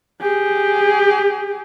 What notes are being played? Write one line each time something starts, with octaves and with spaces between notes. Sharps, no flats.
G4 G#4